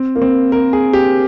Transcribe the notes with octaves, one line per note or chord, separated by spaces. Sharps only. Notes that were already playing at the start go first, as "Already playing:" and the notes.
Already playing: C4
A#3
C4
A#4
G#4
G4